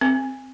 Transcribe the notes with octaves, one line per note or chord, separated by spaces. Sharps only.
C4